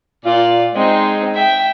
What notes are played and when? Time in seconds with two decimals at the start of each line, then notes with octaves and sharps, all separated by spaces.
0.25 A#2 F4 D5
0.75 G#3 C4 D#4
1.35 E5 G5